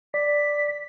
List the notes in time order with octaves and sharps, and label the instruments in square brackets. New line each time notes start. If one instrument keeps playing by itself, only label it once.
[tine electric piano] D5 [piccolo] B6